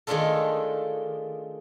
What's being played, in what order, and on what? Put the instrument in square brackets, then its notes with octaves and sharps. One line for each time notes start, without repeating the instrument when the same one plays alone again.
[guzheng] D#3 G#3 A3 D4 F4 A4